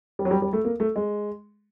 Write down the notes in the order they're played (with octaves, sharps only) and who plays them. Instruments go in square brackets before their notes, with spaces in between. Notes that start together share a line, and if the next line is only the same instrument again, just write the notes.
[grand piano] G3
F#3
G3
G3
A3
A#3
A3
G#3